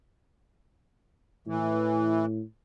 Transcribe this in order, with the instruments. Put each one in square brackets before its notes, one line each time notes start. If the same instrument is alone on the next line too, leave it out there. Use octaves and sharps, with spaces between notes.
[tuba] A2 [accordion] E3